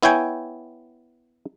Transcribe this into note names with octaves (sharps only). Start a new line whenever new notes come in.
B3 E4 C#5 G5 G#5